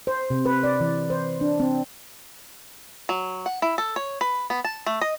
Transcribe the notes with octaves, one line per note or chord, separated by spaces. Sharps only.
C5
C3
B4
D5
E3
C5
D4
C4
F#3
F#5
E4
A4
C#5
B4
B3
A5
A3
D#5